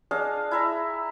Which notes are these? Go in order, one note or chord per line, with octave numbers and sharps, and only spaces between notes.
D4 G#4 D#5 F5
E4 E5 A#5